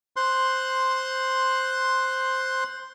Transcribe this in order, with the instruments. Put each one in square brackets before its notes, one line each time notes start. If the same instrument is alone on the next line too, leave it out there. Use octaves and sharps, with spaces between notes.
[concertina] C5 C6 F#6